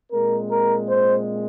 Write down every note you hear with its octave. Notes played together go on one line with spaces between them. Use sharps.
A#2 G#3 C4 A#4
A#4
C5